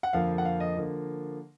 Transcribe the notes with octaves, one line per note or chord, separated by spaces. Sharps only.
F#5
F2 D3 F3 A#3 F5
F#5
F5
D#5
D3 F3 A#3